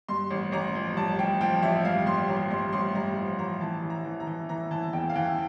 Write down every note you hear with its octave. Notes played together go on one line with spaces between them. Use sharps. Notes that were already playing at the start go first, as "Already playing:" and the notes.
G2 C6
A1
A1 A#5
F3
G2 A5
A1 G5
F3 G5
A1 E5
G2 F5
G2 C6
A1 A#5
G2 C6
A1 C6
G2 A#5
F3
A1 A#5
E3 A5
E3
A#5
E3
A#5
E3
E3 A#5
E3 A5
E2 G5
F5
E3 G5